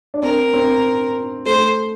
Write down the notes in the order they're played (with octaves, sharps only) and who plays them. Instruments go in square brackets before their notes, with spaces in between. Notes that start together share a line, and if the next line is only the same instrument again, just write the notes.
[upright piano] D4
[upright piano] C4 [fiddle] A#4
[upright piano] C4
[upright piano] A3 [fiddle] C5